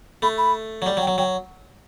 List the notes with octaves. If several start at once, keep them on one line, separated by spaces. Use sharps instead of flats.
A3 B5
B5
F#3
G3
F#3
G5
F#3
F#3 G5